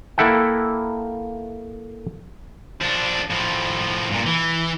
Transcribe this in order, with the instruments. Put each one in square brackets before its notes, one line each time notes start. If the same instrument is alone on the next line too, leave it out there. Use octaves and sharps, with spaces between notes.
[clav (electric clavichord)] A#3 E4 A4 E5 F#5 G5
[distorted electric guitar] F3 D4
A2 F3
G2 A#2
E3